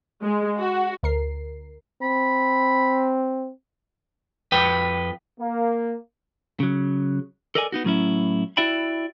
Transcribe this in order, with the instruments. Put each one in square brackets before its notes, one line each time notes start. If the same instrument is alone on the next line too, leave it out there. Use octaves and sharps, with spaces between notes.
[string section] G#3
F#4
[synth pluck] D2 A#4 C7
[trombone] C4 [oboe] B5
[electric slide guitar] F2 B4 G5
[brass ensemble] A#3
[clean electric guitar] C#3 F#3
A4 A#4 D5 D#5 F#5 G#5
B3 D#4 F#4
A2 F#3 C#4 E4
E4 F#4 D5 E5 G5 B5